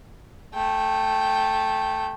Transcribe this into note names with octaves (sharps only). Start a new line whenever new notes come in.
A3 G5